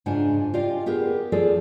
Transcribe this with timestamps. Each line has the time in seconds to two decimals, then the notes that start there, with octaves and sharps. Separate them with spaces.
0.06 G#2 C#3 D4 F4 F#5 G#5
0.54 F4 G4 D5 D#5 F5
0.86 B3 G4 G#4 A#4
1.32 F3 F4 G#4 A4 D5